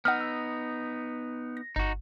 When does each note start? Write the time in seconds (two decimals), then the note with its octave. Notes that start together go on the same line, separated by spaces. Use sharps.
0.05 B3 D#4 F#5 E6 F6
0.20 E6
1.57 A#6
1.76 G1 D#4 F#4